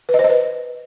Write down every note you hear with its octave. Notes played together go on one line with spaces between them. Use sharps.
B4
D#5
C5
D#5
B4